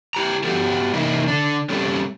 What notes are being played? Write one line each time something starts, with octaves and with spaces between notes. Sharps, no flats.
E4 G4 A#5
A3 B3 F#4 G4 A4
C3 E3 A#3 D#4 E4
D3 D4
G3 A3 C4 C#4 G4 A4